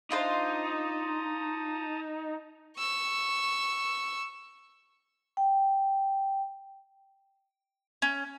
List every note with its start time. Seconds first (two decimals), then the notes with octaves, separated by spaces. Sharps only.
0.10 D4 D#4 F4 C5 A5 A#5 D#6
2.77 C#6 E6
5.37 G5
8.02 C#4